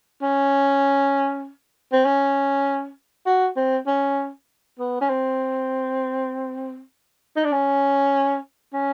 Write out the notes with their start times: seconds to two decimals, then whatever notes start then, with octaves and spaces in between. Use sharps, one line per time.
0.22 C#4
1.93 C4
2.05 C#4
3.26 F#4
3.56 C4
3.87 C#4
4.79 B3
5.01 C#4
5.09 C4
7.36 D#4
7.44 D4
7.51 C#4
8.73 C#4